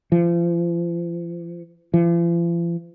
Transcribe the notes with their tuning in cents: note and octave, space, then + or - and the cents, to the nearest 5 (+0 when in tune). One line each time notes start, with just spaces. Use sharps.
F3 -35
F3 -45